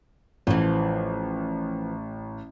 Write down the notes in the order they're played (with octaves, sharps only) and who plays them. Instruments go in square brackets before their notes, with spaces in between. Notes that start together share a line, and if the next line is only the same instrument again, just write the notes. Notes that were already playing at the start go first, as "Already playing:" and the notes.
[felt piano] A1 [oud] E3 F3